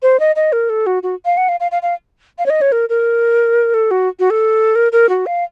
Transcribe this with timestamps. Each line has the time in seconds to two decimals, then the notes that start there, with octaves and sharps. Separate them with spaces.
0.02 C5
0.19 D#5
0.36 D#5
0.52 A#4
0.69 A4
0.86 F#4
1.03 F#4
1.25 F5
1.37 F#5
1.48 F5
1.60 F5
1.71 F5
1.82 F5
2.38 F5
2.46 C#5
2.50 D#5
2.61 C#5
2.72 A#4
2.89 A#4
3.74 A4
3.91 F#4
4.19 F#4
4.30 A4
4.75 A#4
4.92 A#4
5.09 F#4
5.26 F5